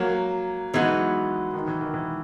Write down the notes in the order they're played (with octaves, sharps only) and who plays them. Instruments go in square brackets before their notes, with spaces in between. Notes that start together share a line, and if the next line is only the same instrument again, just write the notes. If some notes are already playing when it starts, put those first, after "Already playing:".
Already playing: [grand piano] F#3 A#3
[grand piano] E3 G#3 [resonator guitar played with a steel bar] F#3 B3 D#4 F#4
[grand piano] D#3
E3
D#3
E3